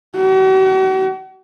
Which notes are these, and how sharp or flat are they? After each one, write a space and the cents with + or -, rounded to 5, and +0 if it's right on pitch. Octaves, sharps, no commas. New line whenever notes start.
F#4 +45